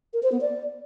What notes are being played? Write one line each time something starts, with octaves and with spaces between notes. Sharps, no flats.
A#4
C5
B3
D5